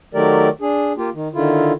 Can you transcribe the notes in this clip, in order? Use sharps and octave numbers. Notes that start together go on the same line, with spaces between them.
D#3 F#3 A3 G4 A#4 D5
D4 G#4
A#3 F4 G4
D#3
D3 D#3 E4 F4